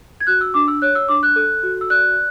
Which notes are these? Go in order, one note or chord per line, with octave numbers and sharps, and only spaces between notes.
G#6
F#4 F#6
E6
D4 D6
E6
C#5 F#6
E6
D4 D6
F#6
A4
F#4
E6
D5 F#6